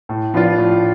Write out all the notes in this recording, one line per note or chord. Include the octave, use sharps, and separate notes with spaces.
A2
F3 B3 D4 F4
A2